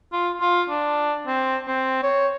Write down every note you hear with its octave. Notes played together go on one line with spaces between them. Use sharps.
F4
F4
D4
C4
C4
C#5